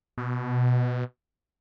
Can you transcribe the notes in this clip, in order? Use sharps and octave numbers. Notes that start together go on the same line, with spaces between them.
B2